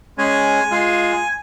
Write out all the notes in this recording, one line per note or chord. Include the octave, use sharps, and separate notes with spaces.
G#3 C#4 G#4 G#5
G#3 F4 G#4